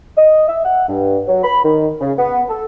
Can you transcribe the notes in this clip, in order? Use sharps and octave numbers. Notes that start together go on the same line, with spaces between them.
D#5
E5
F#5
G2
F#3
B5
D#3
C#3
B3
A4